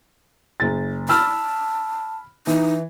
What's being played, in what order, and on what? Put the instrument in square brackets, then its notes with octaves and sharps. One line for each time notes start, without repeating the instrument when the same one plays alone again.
[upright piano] F#1 A6
[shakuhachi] A5 [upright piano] B5 E6 F6
[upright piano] E3 [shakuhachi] D#4